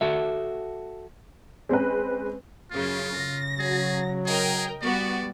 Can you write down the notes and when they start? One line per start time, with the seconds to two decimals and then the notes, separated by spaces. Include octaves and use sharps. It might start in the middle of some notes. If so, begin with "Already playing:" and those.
0.01 F#4 A4 E5
1.69 G#3 C4 C#4 B4
2.71 F#2 C#3 F4
3.16 C#3 A#6
3.59 F#3 G#4
4.26 G#4 A#4 D#5 G5
4.82 G3 B3 F#4 D5